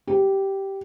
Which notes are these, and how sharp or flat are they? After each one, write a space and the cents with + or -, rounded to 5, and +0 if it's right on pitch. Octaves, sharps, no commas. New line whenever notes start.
G4 -10